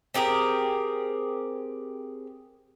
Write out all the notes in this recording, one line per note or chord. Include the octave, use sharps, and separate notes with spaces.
C4 G4 G#4 A#4